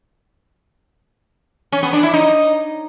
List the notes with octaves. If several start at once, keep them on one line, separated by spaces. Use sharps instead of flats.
C#4
B3
D4
E4
D#4